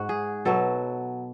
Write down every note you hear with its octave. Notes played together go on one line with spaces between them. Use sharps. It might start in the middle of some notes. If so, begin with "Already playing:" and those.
Already playing: G#2 F#4
G#4
B2 F#3 A4